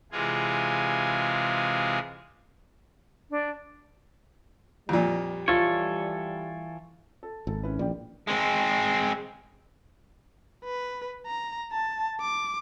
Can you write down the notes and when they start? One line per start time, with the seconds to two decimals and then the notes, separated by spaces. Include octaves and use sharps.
0.12 C3 E3 G#3 F4 G#4
3.30 D4
4.89 F2 A#2 G3
5.48 E3 F4 A4 C#5
7.23 A4
7.47 G#1 A4
7.63 C#4 E4 B4
7.79 A#1 D5 G5
8.28 G#3 C4
10.64 B4
11.26 A#5
11.72 A5
12.21 D6